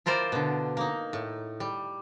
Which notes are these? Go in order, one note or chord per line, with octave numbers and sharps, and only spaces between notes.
E4 F4 A#4 C5 D5
B2 D3
A#3 D#4
A2
G3